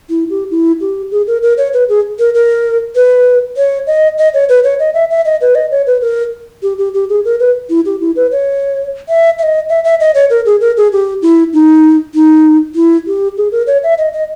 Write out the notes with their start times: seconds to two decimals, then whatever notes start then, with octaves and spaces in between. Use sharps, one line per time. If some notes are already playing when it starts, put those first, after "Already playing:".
0.10 E4
0.30 G4
0.51 E4
0.81 G4
1.11 G#4
1.27 A#4
1.43 A#4
1.58 C#5
1.73 B4
1.89 G#4
2.19 A#4
2.35 A#4
2.95 B4
3.57 C#5
3.87 D#5
4.18 D#5
4.34 C#5
4.49 B4
4.64 C#5
4.79 D#5
4.94 E5
5.10 E5
5.25 D#5
5.41 B4
5.55 D#5
5.71 C#5
5.87 B4
6.01 A#4
6.63 G4
6.78 G4
6.94 G4
7.09 G#4
7.25 A#4
7.40 B4
7.70 E4
7.85 G4
8.00 E4
8.16 B4
8.32 C#5
9.09 E5
9.39 E5
9.43 D#5
9.69 E5
9.84 E5
10.00 D#5
10.15 C#5
10.30 A#4
10.46 G#4
10.61 A#4
10.77 G#4
10.92 G4
11.22 E4
11.53 D#4
12.15 D#4
12.75 E4
13.07 G4
13.37 G#4
13.52 A#4
13.67 C#5
13.83 E5
13.98 D#5
14.13 D#5